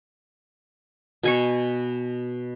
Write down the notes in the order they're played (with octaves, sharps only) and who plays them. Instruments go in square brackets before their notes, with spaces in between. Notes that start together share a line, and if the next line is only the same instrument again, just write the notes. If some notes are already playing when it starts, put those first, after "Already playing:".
[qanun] B2 G#5 C#6